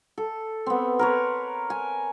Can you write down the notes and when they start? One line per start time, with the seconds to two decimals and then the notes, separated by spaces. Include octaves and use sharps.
0.18 A4
0.66 B3 C4
0.99 A#4 B4 C#5
1.70 G#5